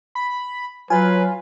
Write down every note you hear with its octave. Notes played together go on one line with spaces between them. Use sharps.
B5
F#3 F4 B4 G#5